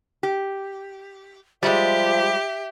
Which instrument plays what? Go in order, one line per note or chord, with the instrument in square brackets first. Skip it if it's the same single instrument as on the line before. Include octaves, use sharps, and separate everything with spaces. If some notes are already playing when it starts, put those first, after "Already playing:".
[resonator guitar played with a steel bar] G4
[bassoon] F3 [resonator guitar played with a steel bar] G3 G#3 [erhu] G4 [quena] E5